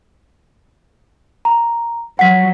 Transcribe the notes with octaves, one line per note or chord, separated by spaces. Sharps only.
A#5
F#3 F#5 B6